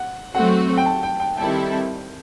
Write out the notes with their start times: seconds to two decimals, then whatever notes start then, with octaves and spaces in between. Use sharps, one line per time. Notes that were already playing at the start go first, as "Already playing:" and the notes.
Already playing: F#5
0.35 F#3 A3 C4 F#4 F#5
0.77 G5
0.86 A5
1.03 G5
1.20 G5
1.37 D#3 G3 C4 E4 A4 G5